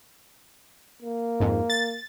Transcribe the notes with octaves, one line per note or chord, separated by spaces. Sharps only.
A#3
F2 G#2
A6